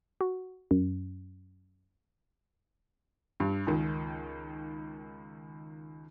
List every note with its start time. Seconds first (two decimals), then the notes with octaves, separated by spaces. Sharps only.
0.21 F#4
0.71 F#2
3.40 G2
3.67 C#2 D#3